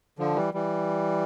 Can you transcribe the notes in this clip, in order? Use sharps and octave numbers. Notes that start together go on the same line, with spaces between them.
D3 F3
E3 G3
E3 G3